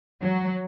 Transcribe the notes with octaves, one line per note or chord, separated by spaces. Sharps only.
F#3